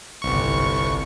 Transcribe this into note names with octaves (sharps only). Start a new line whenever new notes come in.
G1 C2 C#6